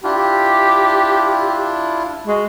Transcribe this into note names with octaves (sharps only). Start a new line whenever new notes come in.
D4 E4 F4 G4
G#3 F#4